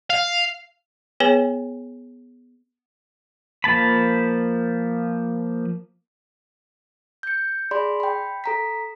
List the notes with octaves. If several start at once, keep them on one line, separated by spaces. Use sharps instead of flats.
F5
B3 G#4 B4 C#5 G#5
F3 A#3 A5 B5
G6 C#7
G#4 D5 B5 C6
G5 B5
A4 A#5 B6